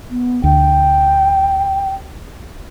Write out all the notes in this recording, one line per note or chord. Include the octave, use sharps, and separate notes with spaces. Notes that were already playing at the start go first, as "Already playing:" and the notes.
B3
D2 G5